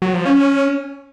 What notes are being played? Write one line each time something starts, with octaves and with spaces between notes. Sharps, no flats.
F#3
F3
C#4